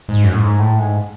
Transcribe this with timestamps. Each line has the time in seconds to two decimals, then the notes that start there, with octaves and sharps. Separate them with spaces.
0.09 G#2
0.23 F#2
0.32 A2
0.38 G#2
0.59 A2
0.79 G#2